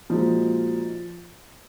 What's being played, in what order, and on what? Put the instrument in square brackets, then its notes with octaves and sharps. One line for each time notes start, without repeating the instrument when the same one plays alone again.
[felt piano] A#2 G#3 D#4 F#4 [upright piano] F3